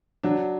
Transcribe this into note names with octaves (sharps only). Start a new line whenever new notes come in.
F#3 D4